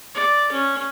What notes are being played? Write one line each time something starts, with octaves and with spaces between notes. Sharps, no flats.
D5
C#4